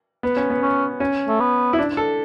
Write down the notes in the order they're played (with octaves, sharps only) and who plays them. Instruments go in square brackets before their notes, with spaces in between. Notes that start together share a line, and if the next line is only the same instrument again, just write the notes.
[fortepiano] B3
C#4
B3
[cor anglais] C#4
[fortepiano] C#4
[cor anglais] A3
B3
[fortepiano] E4
D4
A4